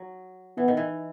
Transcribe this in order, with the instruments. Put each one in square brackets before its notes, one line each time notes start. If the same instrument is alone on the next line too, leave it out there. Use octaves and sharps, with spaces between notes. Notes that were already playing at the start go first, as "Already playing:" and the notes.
Already playing: [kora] F#3
[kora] E3 [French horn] B3
[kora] D#3
E3